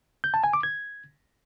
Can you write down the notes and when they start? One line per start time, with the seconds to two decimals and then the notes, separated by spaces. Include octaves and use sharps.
0.24 G6
0.34 A5
0.44 G#5
0.53 D6
0.63 G#6